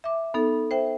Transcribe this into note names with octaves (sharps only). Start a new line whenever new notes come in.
E5 D6
B3 D#4 A4
C5 E5 G5